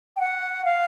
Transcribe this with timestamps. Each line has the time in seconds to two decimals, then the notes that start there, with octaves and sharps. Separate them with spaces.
0.16 G5
0.20 F#5
0.65 F5